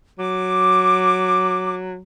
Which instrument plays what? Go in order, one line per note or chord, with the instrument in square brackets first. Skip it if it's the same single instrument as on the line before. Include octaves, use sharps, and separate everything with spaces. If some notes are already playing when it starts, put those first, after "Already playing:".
[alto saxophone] F#3 [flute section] D6